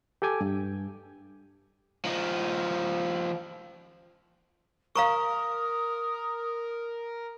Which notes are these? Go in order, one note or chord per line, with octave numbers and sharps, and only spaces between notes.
G4 A4 G5 G#5 D6
G2
F3 D#4
A#4 F5 A#5 C#6 D#6